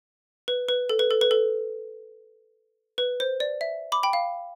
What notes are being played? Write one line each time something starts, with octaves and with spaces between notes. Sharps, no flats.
B4
B4
A4
B4
A4
B4
A4
B4
C5
D5
E5
B5 D6
G5 B5
F5